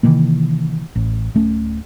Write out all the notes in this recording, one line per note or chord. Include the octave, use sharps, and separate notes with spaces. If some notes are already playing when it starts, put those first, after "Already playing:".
C3 D#3 E3 A#3
A1
D1 A3 C#4